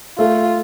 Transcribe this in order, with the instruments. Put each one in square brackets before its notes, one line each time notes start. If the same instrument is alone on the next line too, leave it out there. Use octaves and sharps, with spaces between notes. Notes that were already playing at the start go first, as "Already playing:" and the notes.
[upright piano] A3 [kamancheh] F4